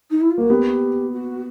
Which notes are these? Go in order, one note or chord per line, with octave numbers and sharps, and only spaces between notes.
D#4
E4
F4
A#3 F#4
B3 G4
F#4